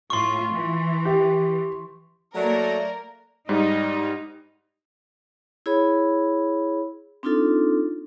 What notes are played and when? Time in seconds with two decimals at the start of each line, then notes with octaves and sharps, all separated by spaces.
0.10 A2 F4 C6 C#6
0.53 E3
1.05 G4
2.35 F#3 A3 A#3 A#4 D5
3.49 G#2 G3 D#4
5.66 E4 G#4 C#5 B5
7.23 C4 D4 D#4 F4 A4